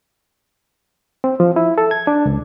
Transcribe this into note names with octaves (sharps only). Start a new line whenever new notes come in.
C4
F3
E4
A4
G#6
D4
C#2